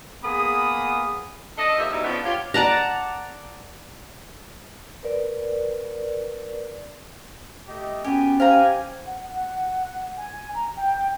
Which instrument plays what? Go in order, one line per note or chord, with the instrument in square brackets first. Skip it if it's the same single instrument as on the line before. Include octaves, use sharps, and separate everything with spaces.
[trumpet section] A#3 B3 G#4 B5 D#6
[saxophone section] D4 A4 D#5
D#2 F3 G3 E5
G#2 B2 G3 A3 D#4 E4
F3 B3 C#4 D4
F4 G4 C#5
[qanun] D5 F#5 A5 A#5
[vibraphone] A#4 B4 D5
[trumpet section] A3 G4 D#5
[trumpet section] B3 F#4 G#5 [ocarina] C#4 [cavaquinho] G4
[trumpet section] G4 G#5 [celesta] C5 [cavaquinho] F5 G5 A#5
[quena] F#5
F#5
G#5
A#5
G5